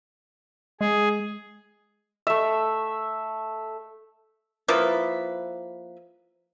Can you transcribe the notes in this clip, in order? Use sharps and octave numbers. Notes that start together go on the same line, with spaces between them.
G#3 G#4
A3 E5
F3 A#3 E4 B4